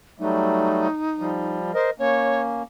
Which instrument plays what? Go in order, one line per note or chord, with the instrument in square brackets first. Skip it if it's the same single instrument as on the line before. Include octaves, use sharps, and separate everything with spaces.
[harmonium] F#3 G3 A3 [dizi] D#4
[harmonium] F3 G3
[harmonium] A#4 D#5 [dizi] C5
[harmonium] A#3 C#4 [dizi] C#5